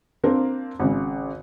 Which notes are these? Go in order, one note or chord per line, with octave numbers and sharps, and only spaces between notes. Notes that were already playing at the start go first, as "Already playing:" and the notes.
A#3 C4 D4 F4 A#4
G#1 C#3